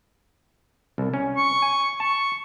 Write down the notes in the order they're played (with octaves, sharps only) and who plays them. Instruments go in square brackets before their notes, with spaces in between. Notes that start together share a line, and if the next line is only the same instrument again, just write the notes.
[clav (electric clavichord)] C2
C#4
[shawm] C#6
[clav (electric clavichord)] G#5
[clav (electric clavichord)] A5 [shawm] C#6